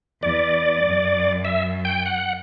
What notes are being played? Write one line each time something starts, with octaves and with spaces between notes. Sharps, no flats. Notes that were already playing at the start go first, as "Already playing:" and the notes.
E2 D5
F#2
E5
G5
F#5